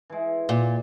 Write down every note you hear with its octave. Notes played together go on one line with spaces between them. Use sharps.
E3 G#3
A#2